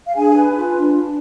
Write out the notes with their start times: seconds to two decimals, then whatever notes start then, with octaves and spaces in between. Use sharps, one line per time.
0.06 F5
0.15 D4 G#4 G#5
0.35 B4
0.55 F4
0.74 D4
0.94 D4